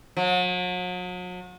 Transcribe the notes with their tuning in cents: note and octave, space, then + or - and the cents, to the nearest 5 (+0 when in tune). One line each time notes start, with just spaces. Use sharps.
F#3 -40